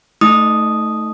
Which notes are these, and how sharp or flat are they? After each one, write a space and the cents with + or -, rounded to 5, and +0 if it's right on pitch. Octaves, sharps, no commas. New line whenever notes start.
A3 +0 D#4 +20 D#6 +0